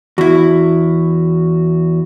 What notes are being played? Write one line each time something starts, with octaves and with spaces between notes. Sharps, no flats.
E2 E4 F#4